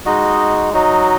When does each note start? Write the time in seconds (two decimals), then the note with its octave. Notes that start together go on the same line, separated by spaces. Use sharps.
0.06 G#3 D#4 F#4 D#5
0.73 F#3 D#4 F#4 D#5